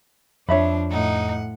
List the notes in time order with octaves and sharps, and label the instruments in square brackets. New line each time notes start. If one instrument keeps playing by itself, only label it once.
[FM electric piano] F2 [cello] F3 D4 [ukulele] C#5 E5 B5
[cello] A2 F#5 [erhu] D#4